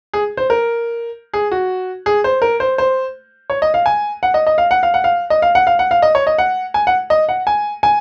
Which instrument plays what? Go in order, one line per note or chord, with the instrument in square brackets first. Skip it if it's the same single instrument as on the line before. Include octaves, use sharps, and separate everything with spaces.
[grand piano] G#4
C5
A#4
G#4
F#4
G#4
C5
A#4
C5
C5
C#5
D#5
F5
G#5
F#5
D#5
D#5
F5
F#5
F5
F#5
F5
D#5
F5
F#5
F5
F#5
F5
D#5
C#5
D#5
F#5
G#5
F#5
D#5
F#5
G#5
G#5